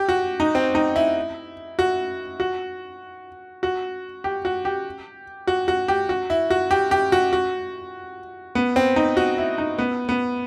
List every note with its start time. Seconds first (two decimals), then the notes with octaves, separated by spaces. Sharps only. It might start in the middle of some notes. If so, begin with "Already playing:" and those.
Already playing: G4
0.09 F#4
0.40 D#4
0.55 C4
0.75 D#4
0.96 E4
1.79 F#4
2.40 F#4
3.63 F#4
4.24 G4
4.45 F#4
4.65 G4
5.47 F#4
5.68 F#4
5.88 G4
6.09 F#4
6.30 E4
6.50 F#4
6.71 G4
6.91 G4
7.12 F#4
7.33 F#4
8.55 B3
8.76 C4
8.96 D#4
9.17 F#4
9.38 E4
9.58 D#4
9.79 B3
10.09 B3